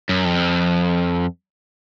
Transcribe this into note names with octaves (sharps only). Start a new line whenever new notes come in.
F#2
F2